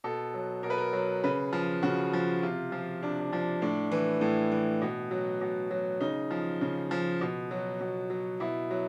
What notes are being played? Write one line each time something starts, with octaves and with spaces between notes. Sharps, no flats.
B2 A4
F#3
B2 A#4
B4
A#4
F#3
C#3 B4
F3
C#3 F#4
F3
C3 F4
F3
C3 D4
D4
F3 D4
A2 D4
E3
A2
E3
B2
F#3
B2
F#3
C#3 D#4
F3
C#3
F3
B2
F#3
B2
F#3
B2 E4
F#3